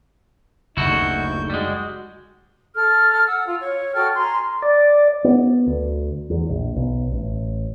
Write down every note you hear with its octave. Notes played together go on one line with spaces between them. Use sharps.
F#1 D2 D#4 E4 F#4 C#6 G6
G3 G#3 F#4
A4 F6
F#5 E6
F4
C#5
F#4 A4 G5 F6
G#5 A#5 C6
D5
B3
D2
E2
A#1
B1
A1